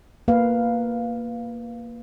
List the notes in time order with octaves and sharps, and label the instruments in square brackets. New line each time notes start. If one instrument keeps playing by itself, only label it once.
[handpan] A#3 B4 F5